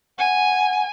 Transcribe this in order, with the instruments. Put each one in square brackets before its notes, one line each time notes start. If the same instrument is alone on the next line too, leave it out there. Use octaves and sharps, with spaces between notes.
[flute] F#5 [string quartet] G#5